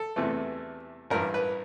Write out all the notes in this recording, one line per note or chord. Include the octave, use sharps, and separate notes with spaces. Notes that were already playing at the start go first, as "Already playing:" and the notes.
Already playing: A4
E2 C3 E3 A3
A1 G2 E3 A#4
B4